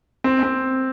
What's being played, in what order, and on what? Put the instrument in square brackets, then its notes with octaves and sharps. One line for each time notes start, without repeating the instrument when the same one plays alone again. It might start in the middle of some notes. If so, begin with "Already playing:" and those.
[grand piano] C4
C4